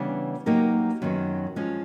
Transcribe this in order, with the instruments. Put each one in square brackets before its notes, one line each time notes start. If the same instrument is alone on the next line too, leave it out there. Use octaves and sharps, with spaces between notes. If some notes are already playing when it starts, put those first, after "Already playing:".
Already playing: [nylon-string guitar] C#3 E3 G3 B3 D4
F#3 A#3 D#4 G4 A#4
F#2 D#3 F#3 B3
F3 G#3 C#4